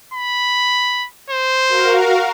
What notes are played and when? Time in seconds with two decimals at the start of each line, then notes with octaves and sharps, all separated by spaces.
0.13 B5
1.30 C5
1.69 F#4 A#4 F5